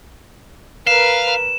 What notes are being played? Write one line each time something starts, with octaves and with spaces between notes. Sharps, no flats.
A#4 B4 F5 E7